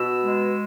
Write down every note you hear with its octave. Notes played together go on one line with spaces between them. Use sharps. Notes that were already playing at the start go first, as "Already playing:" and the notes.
Already playing: B2 E6
G#3